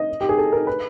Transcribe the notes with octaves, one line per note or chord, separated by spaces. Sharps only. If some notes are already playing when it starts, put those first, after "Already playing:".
Already playing: D#5
G4
G#4
A4
A#4
B4